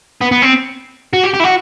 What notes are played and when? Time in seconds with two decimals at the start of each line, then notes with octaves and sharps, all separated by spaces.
0.21 B3
0.32 B3
0.42 C4
1.13 F#4
1.24 G4
1.34 G4
1.40 E4
1.44 F#4